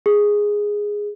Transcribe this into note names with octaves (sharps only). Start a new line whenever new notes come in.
G#4